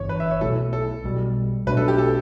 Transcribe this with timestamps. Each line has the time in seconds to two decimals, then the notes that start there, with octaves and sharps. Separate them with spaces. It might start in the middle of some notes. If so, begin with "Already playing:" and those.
Already playing: G1 G2 E3 C#5
0.09 B4
0.20 E5
0.31 C#5
0.41 B1 B2 A3 E4 A4
0.73 A4
1.04 B1 B2 G3
1.67 B1 B2 A3 D4 B4
1.77 A4
1.88 G4
1.98 A4